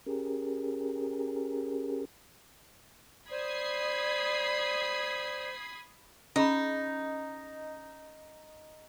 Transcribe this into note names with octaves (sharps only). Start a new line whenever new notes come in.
C#4 G4 G#4 A#4
C5 D5 B5 D#6 G#6 C7
C#4 D#4 G#4 B5